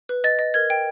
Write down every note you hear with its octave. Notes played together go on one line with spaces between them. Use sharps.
B4
D#5 A6
D#5
A#4 G#6
G5